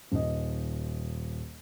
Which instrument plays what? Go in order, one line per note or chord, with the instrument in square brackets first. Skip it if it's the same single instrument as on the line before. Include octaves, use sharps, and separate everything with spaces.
[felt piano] D#1 D#5